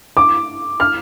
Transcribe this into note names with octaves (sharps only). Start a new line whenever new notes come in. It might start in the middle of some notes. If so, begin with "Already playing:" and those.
D6
F6